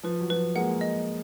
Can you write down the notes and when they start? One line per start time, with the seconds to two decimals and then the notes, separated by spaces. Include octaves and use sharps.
0.03 F3 B4
0.21 F#3
0.30 F3 B4
0.55 G#3 A#3 F#5
0.81 D#5